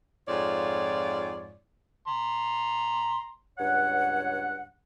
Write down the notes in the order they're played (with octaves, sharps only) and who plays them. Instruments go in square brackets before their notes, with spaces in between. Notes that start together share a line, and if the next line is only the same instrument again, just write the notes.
[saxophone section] F2 G#2 F4 C#5 D5
[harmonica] A#5 C6
[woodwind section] C#2 G2 C#5 F#5